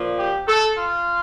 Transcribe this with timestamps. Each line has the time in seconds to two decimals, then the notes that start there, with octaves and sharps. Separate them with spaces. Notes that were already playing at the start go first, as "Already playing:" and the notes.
Already playing: A#2 F3
0.18 G4
0.47 A4
0.75 F4